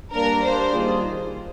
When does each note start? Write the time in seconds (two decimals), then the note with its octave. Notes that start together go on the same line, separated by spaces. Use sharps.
0.13 G3 A#3 D4 A#4
0.43 G3 A#3 D4 C5
0.72 D#3 G3 A#3 F4 G#4